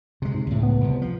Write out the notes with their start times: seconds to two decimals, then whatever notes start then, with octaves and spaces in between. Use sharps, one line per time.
0.22 C3 G#3
0.34 G#2
0.47 C#2 A2
0.63 B3
0.81 C2 C3
1.02 F3